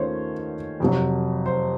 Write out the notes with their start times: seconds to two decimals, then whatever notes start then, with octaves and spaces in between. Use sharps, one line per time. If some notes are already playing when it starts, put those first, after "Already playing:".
Already playing: D#2 D#3 A3 C#4 F4 C5 C#5
0.80 F2 C3 F#3
1.46 C5